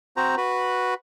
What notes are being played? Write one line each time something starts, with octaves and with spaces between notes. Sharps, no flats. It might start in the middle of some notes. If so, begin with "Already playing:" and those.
C4 F#4 C5 A#5
F#4 B4